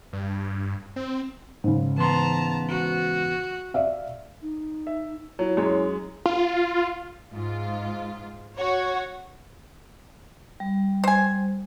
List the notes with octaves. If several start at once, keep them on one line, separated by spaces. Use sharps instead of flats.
G2
C4
G#2 C#3
E3 B3 A5 A#5 C6
F#4
D5 E5 F5
D#4
E5
F#3 E4
F#2 G#3 C#5
F4
G#2 F4
F#4 C#5
G3
C5 G#5